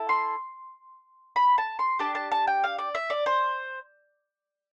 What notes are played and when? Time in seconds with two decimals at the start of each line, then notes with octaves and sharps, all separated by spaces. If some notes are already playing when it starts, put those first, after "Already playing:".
Already playing: E4 A4
0.09 C6
1.36 B5
1.58 A5
1.79 C6
1.99 D4 G4 A5
2.15 A5
2.32 A5
2.47 G5
2.64 F5
2.78 D5
2.95 E5
3.10 D5
3.26 C5